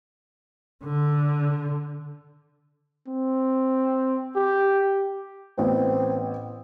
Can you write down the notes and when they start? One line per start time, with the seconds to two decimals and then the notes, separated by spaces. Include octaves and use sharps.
0.84 D3
3.08 C4
4.36 G4
5.58 A1 B3 C4